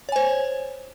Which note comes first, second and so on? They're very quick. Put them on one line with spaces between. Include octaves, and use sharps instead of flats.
C#5 G#5 C5